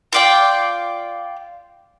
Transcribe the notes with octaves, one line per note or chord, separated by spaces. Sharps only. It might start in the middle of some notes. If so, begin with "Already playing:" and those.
F4 D5 G5